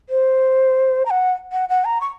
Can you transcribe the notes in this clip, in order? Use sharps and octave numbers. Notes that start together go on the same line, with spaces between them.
C5
A#5
F#5
F#5
F#5
A#5
C#6